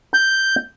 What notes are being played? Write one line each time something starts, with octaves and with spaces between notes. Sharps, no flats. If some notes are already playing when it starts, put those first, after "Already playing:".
G6